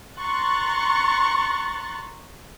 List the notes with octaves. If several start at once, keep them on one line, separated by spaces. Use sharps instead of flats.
A#5 C6 C#6 F#6 A6